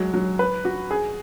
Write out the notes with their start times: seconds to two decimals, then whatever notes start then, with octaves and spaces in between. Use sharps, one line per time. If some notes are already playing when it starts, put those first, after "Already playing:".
Already playing: F#3 G#3
0.14 F#3
0.39 B4
0.65 F#4
0.91 G#4